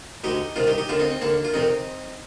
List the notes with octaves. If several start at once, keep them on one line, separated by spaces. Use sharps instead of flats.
D2 D3 D#4 G4
C2 C3 D#3 D4 F4
D#4 G4
D#4 G4
D#2 D3 D4 F4
C4 D#4
C4
D#2 D3 A#3 D4
F4
F2 C3 D#3 C4 D#4